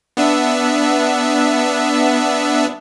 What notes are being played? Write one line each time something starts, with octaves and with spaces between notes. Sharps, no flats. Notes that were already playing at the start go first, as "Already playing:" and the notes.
B3 D4 E5